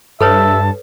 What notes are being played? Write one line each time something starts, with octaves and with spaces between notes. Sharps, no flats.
G2 A4 B4 C#5 E5 A5